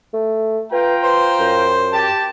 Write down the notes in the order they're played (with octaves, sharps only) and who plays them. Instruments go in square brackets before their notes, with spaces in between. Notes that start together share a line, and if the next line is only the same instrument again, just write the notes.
[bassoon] A3
[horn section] F4 G5 A#5 [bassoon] B4
[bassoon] B4 [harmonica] C5
[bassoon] F#2
[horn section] G4 A5